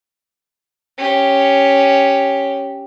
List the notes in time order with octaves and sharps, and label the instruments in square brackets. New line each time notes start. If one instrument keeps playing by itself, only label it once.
[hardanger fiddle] C#4 G4